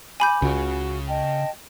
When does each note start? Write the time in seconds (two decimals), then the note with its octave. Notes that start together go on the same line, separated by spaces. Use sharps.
0.20 G#5 B5 D6 G6
0.42 C#2 C#3 F#4
1.08 D#5 G5 A5